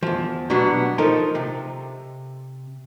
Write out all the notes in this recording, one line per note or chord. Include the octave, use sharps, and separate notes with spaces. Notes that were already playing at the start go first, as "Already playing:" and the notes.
E2 F3
B2 F#3 G3 B3 D4
F3 D#4 A4 A#4
C3